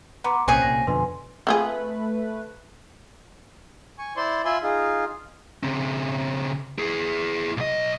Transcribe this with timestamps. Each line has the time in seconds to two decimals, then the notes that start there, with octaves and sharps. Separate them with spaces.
0.24 B3 A#5 C6 D6
0.48 C2 A#2 C4 C#4 G#4 F#6
0.62 C2 A#2 A#6
0.87 F2 B2 D3 B4 G#5 C6
1.47 A3 C4 F4 G#4 B4
3.99 G#5 C#6
4.17 E4 C5 D5 C6
4.45 F4 E5 G#5 B5 C6
4.63 D#4 F4 G#4 F5
5.63 C#3 C4
6.78 E4 G#4
7.57 B1 D#5